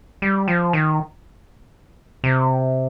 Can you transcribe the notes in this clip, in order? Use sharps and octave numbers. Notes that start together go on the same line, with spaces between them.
G3
F3
D#3
C3